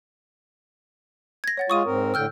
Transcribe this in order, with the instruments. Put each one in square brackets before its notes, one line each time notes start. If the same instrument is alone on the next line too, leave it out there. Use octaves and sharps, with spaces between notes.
[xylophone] G#6 A#6
C#5 F#5 A6
[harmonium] G#3 F4 [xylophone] C#6 D#6 D#7
[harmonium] G#2 C4 A#4
[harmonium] A2 D3 G5 [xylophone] E6 F6 G6